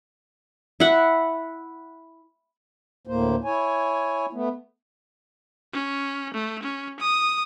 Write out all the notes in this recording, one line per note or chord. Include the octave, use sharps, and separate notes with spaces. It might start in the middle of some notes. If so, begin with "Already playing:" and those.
E4 F#5
D2 A2 A#3 C5
E4 C#5 G#5
A3 B3
C#4
A3
C#4
D#6